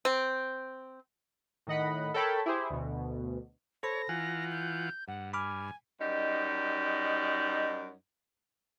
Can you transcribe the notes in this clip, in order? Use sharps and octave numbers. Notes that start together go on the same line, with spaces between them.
C4
A2 D#3 D#5 F#5 B5
A4 A#4 C#5 G5 A5 B5
E4 G4 G#4 C5
D2 B2
A4 C5 C#5 B5 A#6
E3 F4 F#5 G#5
G6
G2 F#5
G#5 B5 D6 F6
F#2 G3 D#4